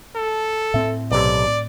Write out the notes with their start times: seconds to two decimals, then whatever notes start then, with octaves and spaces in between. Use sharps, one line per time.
0.15 A4
0.74 A2 C4 E5
1.11 B1 C3 D5